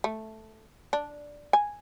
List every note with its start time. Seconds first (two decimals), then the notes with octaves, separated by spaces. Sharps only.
0.04 A3
0.93 D4
1.53 G#5